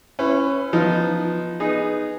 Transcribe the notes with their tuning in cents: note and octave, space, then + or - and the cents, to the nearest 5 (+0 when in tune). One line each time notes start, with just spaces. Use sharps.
C#4 -15 E4 +0 B4 +25
F3 +0 B3 +0 D#4 +0
B3 +0 D#4 -15 G#4 +0